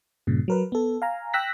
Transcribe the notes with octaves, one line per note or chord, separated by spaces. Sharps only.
G2 A#2 C#3
F#3 A#4 B4
B3 A4
F5 G#5 A#5
G5 E6 F#6 A#6 B6